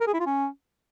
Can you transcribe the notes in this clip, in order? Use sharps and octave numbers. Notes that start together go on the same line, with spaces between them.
A#4
G#4
E4
F4
C#4